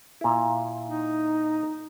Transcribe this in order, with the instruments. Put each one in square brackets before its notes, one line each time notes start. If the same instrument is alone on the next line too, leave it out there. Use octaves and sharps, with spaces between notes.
[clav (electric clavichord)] A#2 E4
[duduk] D#4